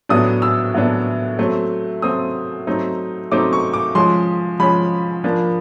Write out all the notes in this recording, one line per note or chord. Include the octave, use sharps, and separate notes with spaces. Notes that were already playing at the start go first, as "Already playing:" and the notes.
A2 F#3 B3 D4 D#6
E6
A2 F#3 B3 D4
F#3 A3 C4
F#3 A3 C4 D#6
F#3 A3 C4 D#4
F#3 A3 C4 D#4 D6
C#6
D6
F3 G#3 C#4 C6
F3 G#3 C#4 B5
F3 A#3 D4